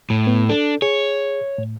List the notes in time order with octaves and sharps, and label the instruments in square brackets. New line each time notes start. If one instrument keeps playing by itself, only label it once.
[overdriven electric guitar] A2
[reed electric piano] B3
[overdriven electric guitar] D4 [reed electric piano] A4
[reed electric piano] G#4 [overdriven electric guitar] C#5
[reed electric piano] A2